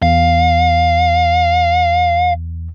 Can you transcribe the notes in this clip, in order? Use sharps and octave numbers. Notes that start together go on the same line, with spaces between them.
E2 F5